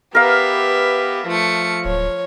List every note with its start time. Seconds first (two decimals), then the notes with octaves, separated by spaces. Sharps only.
0.15 B3 G4 A#4 B4 E5 F5
1.27 F3 A3 C#7
1.85 D1 C#5